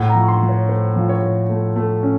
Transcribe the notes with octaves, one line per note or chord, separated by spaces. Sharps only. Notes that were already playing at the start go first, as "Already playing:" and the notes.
Already playing: A2 F#5
A#5
F3
C#6
C6
F3
C#5
A3 C5
F3
C#5
A2
A3
A3
C#4